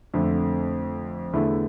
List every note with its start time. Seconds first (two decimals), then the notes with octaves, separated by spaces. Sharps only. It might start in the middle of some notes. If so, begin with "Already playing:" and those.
0.14 F2 D3 A3
1.33 E2 D3 A3 E4